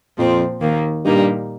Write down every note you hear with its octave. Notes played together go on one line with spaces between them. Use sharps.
F2 A#2 F3 C4
D#2 D#3 A#3
G2 A#2 G3 A#3 D#4